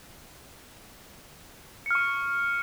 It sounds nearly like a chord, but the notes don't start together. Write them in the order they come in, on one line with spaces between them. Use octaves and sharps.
C#7 F6 C#6